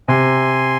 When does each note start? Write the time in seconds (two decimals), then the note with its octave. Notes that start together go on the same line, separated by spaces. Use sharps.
0.08 C3 G#5 C6